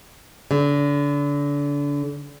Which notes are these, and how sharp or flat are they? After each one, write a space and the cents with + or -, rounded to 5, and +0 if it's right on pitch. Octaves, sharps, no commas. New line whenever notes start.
D3 -30